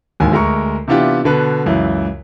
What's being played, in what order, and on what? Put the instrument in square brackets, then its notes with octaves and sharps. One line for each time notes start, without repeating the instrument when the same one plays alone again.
[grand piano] D1 D#2 G#2 D#3 G#5
D2 G#3 A#4 C#6
C3 E3 B3 D4 F4 G4
B2 D3 B4
C#2 F#2 E3